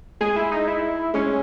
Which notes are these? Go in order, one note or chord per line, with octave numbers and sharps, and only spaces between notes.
G#3 G#4
E4
D#4
E4
G#3 C#4